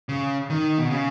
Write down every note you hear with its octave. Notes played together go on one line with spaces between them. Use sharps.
C#3
D#3
B2
C#3